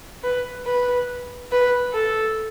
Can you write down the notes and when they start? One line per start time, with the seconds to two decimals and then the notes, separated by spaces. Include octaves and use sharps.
0.23 B4
0.65 B4
1.52 B4
1.94 A4